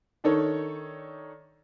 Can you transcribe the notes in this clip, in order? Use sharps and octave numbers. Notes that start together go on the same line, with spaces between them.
D#3 D4 D#4 A4 C#5